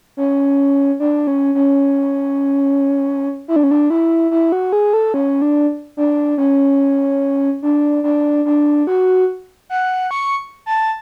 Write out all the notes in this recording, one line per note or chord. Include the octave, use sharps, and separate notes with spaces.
C#4
D4
C#4
C#4
E4
D4
C#4
D4
E4
E4
F#4
G#4
A4
C#4
D4
D4
C#4
D4
D4
D4
F#4
F#5
C#6
A5